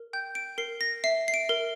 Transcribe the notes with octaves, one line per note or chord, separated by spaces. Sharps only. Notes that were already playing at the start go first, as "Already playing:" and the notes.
Already playing: A#4
G5 G6
D7
A#4 C7
A#6
E5 C7
C7
D7
A#4